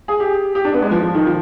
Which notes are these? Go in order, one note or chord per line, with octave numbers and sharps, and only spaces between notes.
G#4
G4
G4
D4
B3
G#3
F3
F3
D#3
F3